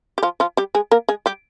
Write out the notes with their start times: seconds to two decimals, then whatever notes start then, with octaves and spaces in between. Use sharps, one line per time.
0.18 G4
0.23 F3 F4
0.40 F3 F4
0.57 G3 G4
0.75 G#3 G#4
0.91 A#3 A#4
1.09 G#3 G#4
1.26 G3 G4